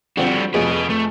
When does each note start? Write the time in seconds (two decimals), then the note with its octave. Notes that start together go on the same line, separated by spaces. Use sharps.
0.17 D3 F3 G3 C4 F#4
0.54 F1 F3 G#4 B4 D#5
0.90 A3